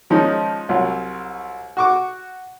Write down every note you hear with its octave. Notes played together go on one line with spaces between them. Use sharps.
D#3 F3 G#3 C#4 D#4
C2 F#3 F4
F#4 C#6 D6